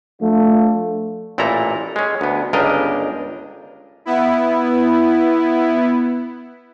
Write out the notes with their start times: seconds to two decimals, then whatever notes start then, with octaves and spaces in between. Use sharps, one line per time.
0.21 F3 A3 D4 F4
1.38 A1 A#2 E4 A4 A#5
1.96 G#3 C#4
2.21 D2 B3
2.53 G1 C#2 D4 G4 A#4 D#5
4.05 B3 E4